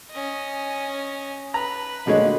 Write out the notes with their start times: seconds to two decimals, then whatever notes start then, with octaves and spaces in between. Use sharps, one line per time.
0.11 C#4 D#5
1.54 B4 A#5
2.07 D2 A#2 D3 G#3 C#5 D#5